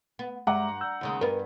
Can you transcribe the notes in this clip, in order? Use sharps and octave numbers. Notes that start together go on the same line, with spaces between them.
B3
G2 G#3 E5 F#5 A#5 D6
E6 G6
D#2 C#3 G#3
G2 B3 A#4 B4